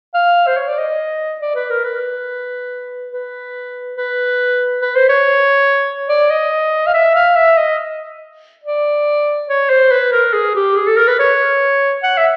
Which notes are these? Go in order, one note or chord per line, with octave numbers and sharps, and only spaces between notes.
F5
C5
C#5
D5
D#5
D5
B4
A#4
B4
B4
B4
B4
C5
C#5
D5
D#5
F5
E5
F5
E5
D#5
D5
C#5
C5
B4
A#4
G#4
G4
G#4
A4
A#4
B4
C#5
F#5
E5